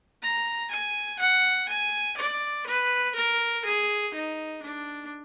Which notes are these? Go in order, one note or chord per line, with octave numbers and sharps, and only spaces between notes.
A#5
G#5
F#5
G#5
D5
B4
A#4
G#4
D#4
D4